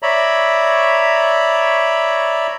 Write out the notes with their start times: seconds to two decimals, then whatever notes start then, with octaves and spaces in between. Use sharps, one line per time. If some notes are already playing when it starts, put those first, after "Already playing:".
0.02 C#5 D5 E5 A#5 B5